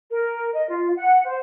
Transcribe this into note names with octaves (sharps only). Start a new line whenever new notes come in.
A#4
D#5
F4
F#5
C5